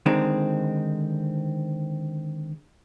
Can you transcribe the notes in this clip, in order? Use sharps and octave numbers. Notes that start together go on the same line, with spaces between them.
D3 D#3 G#3 C4